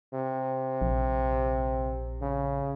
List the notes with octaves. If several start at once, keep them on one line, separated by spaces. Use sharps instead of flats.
C3
A#1
C#3